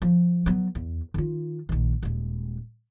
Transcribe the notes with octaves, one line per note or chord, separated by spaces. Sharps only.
F3
F#3 B3
E2
D#3 F4
A#1 D#3
D#1 G#3